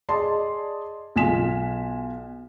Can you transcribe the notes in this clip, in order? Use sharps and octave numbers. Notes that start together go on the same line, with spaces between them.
G#4 D5 D#5 A5 C6
B1 F4 G#5 B6 E7